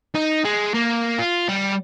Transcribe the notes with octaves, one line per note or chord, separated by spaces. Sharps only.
D#4
G#3
A#3
F4
G3